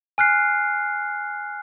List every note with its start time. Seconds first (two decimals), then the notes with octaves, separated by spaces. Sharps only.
0.18 G#5 F6 F#6 C7